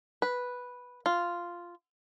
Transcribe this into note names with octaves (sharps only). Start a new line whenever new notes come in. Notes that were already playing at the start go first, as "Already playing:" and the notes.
B4
F4